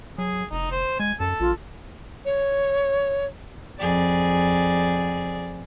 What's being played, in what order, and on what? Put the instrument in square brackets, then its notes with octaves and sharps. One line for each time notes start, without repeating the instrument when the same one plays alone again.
[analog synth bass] F#3 [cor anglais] G#4
[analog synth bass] F1 [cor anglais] D#4
[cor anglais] C5
[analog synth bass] G#3 [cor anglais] G#5
[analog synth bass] F#2 [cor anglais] A4
[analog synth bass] A#1 [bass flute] F4
[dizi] C#5
[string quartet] F2 G#4 D5